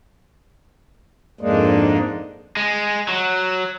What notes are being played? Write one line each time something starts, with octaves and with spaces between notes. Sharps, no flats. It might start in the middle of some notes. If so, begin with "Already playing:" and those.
F2 G#2 G#3 A#3 D4 D#4
G#3
F#3